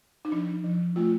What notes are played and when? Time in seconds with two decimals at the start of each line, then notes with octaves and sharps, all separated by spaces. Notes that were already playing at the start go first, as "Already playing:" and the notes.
0.25 D#4
0.32 F3 D4
0.64 F3
0.96 A3 F4